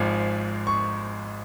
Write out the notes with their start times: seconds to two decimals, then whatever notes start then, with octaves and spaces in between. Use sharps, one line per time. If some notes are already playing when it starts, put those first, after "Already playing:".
Already playing: G#1 G#2 F3 G#3
0.67 C#6